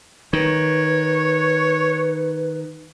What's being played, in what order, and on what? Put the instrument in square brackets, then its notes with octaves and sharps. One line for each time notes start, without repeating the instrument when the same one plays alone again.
[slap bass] D#3 [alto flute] B4 [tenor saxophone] C#5